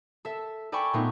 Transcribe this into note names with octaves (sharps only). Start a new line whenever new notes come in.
A4 E5
A4 D5 G5 G#5 B5 C#6
A#2 A3 B3 C4 D#4 C#6